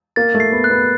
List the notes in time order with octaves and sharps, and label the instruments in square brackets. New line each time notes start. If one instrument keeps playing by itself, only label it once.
[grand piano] A#3 [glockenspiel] A6
[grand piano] A3
[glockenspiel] C7
[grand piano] B3
[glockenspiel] F#6
[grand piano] B3